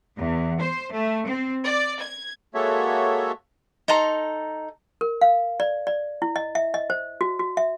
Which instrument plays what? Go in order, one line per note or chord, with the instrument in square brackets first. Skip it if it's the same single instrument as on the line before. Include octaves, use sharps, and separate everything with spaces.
[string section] E2
C5
A3
C4
D5
G#6
[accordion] G#3 A#3 F#4 A4 C#5 E5
[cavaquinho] D#4 A4 A#5 C6
[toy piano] A#4
F5
D5
D5
E4
D#5
E5
D#5
C5
F#4
F#4
E5